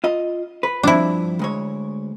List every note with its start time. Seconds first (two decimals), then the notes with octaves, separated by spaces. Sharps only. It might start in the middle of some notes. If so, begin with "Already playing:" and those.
0.04 F4 D#5
0.63 B4
0.83 G2 F3 C4 D4 E4
1.39 D2 G#3 C#5